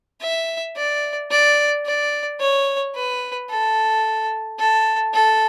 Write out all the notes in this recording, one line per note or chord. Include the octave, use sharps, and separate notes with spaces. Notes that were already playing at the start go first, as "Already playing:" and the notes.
E5
D5
D5
D5
C#5
B4
A4
A4
A4